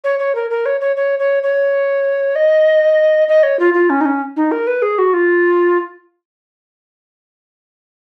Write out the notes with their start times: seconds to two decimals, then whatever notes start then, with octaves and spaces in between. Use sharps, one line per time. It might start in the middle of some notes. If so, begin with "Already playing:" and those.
0.04 C#5
0.19 C#5
0.35 A#4
0.50 A#4
0.66 C#5
0.81 C#5
0.96 C#5
1.19 C#5
1.43 C#5
2.36 D#5
3.28 D#5
3.43 C#5
3.59 F4
3.74 F4
3.90 C#4
4.01 D#4
4.05 C#4
4.36 D#4
4.52 A#4
4.67 B4
4.82 G#4
4.98 F#4
5.13 F4